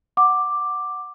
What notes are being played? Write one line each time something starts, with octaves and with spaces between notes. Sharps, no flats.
F#5 D6